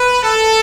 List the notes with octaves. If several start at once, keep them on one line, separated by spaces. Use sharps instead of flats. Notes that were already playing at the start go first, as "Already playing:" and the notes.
Already playing: B4
A4